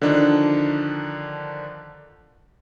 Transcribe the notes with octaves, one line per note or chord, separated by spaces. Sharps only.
D3 D#3 F3 D4 D#4